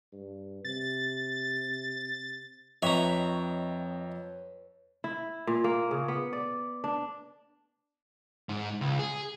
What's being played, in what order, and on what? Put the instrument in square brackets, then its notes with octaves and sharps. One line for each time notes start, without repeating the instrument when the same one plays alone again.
[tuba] G2
[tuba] C3 [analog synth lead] A6
[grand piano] F2 D#5 F7 [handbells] C4 [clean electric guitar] B4 C#5 [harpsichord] E5 A#5
[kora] E4
A#2
A#3
C#3
B3
D5
D4
[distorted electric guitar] G#2
C#2
G#4